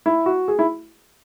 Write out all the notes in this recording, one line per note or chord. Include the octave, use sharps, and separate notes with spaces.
E4
F#4
G#4
E4